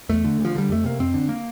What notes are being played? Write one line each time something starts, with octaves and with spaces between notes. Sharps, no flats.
E2 A3
D3
D2
F3
D3 G3
F2 A3
C3 A#3
F2 C4
D3
A#3